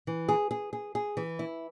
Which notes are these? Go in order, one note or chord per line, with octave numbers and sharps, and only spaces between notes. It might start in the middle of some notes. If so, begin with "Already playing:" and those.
E3
G#4
G#4
G#4
G#4
E3
E4